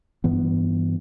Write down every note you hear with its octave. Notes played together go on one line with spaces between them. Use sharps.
G2 E3 B3